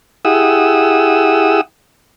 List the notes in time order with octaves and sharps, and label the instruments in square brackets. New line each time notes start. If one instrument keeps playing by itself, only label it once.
[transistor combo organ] E4 G4 G#4 F#5 D#6 E6